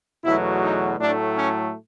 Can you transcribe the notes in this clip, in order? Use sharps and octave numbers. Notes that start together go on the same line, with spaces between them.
E2 B2 F#3 A3 E4
D#4
A2 F#3 A3 D4
C#4